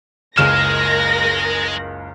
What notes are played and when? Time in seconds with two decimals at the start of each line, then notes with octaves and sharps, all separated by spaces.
0.38 F#1 C#2 G#3 A#4 F6 A#6 E7